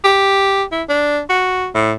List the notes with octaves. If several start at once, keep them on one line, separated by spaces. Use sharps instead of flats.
G4
E4
D4
F#4
A2